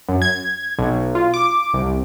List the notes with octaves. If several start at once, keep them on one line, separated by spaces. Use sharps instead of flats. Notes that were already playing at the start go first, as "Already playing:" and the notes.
F#2
G#6
B1
F4
D6
C2